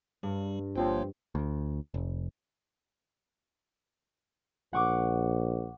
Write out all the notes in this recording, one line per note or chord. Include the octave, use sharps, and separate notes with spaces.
G2 G3
G1 F3 A#3 C4 C#5
D2
F1
A#1 F#5 C#6 D6